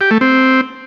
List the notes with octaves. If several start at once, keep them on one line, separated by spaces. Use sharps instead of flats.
G4
A3
C4